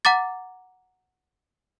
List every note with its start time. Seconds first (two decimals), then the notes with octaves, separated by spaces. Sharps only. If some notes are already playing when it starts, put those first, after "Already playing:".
0.05 F#5 A#5 D6 A6